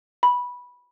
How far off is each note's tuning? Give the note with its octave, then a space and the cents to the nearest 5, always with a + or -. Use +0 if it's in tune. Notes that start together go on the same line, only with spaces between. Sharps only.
B5 -10